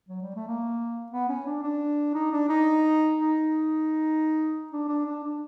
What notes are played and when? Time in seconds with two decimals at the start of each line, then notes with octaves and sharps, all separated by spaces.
0.09 F#3
0.22 G3
0.35 A3
0.48 A#3
1.12 B3
1.29 C#4
1.46 D4
1.63 D4
2.14 D#4
2.32 D4
2.49 D#4
3.18 D#4
4.73 D4
4.89 D4
5.06 D4
5.23 D4